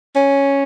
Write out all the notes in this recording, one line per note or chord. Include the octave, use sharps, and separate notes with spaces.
C#4